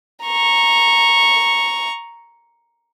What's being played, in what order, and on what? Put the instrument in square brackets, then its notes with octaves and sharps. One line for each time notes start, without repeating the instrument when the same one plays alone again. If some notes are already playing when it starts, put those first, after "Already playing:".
[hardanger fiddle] A#5 C#6